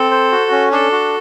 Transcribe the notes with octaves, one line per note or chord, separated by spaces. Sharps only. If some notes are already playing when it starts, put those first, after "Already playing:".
Already playing: C4 A4
C5
F#4
C#4
D4 A4
F#4